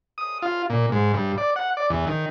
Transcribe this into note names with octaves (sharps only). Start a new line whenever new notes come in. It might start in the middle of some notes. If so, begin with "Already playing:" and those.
D#6
F4
A#2
G#2
G2
D5
F#5
D5
E2
D#3